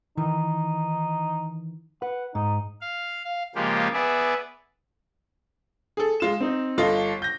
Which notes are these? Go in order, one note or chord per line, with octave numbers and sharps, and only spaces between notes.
D#3 E3 D#4
B4 F#5
G#2 D#4
F5
F5
C#3 F3 G#3 A#3 F4 G4
B3 G#4 D5 E5
G#4 A4
G#3 F4 E7
C4 D#4
G1 F4 A4 D#5
G6 A#6